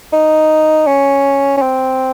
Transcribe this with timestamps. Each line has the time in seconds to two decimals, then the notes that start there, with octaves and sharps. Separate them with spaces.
0.13 D#4
0.87 C#4
1.57 C#4
1.62 C4